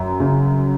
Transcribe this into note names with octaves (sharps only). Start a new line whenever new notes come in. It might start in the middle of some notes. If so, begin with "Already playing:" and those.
Already playing: F#2
C#3